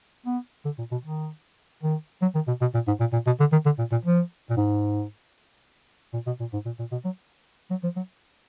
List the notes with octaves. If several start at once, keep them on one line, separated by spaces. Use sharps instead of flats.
B3
D3
A#2
B2
D#3
D#3
F#3
D#3
B2
B2
A#2
G#2
A#2
A#2
B2
D3
D#3
D3
A#2
A#2
F3
A#2
G#2
A#2
B2
A#2
G#2
A#2
A#2
B2
F#3
F#3
F3
F#3